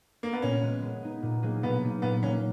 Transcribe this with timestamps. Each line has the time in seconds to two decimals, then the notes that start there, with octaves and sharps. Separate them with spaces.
0.23 A#3
0.33 B3
0.42 A#2 C#4
0.62 G#3 B3
0.82 G#3
1.03 B3 D#4
1.22 A#2
1.43 F#3 A#3 D#4 G#4
1.63 B2 B3
1.83 A#3 D#4
2.02 A#2 B3
2.23 F#3 A#3 C#4